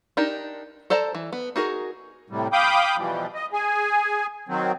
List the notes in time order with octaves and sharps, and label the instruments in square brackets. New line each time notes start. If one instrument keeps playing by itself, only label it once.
[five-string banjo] D4 D#4 G4 A#4
A4 C5 D5 A5 A#5
E3
B3
D#4 F#4 G#4 A#4
[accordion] A2 C3 G3
F5 G5 B5 D6 D#6 G6
B2 E3 F3 G3
D#5
G#4 G#5
D#3 F#3 C4